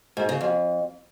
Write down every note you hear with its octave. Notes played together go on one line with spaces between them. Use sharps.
G#2
C#3
F2